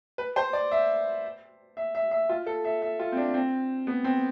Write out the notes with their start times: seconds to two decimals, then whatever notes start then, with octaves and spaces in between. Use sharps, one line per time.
0.18 B4
0.36 C5
0.53 D5
0.72 E5
1.77 E5
1.95 E5
2.11 E5
2.29 F4
2.47 A4
2.65 E5
2.82 E5
2.99 F4
3.12 C4
3.17 D4
3.34 C4
3.87 B3
4.04 C4